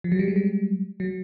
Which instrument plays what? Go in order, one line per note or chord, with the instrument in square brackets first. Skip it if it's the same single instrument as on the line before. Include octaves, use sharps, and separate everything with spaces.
[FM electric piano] F3
F#3
G3
G#3
G3
F#3